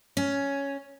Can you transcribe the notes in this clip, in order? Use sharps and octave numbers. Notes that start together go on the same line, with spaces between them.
C#4